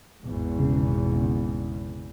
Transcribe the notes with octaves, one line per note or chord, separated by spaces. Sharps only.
G#1 E2 B2
C#3